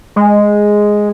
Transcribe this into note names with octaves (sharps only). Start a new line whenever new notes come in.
G#3